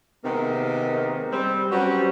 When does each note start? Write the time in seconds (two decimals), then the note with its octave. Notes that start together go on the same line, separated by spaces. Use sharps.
0.24 C3 D#3 G#3 A#3 B3
1.32 G3 C4
1.70 F#3 G3 C#4 F#4 B4 C5